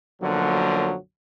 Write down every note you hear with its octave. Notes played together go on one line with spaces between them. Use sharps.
B1 F#2 D3 F3 F#3 A#3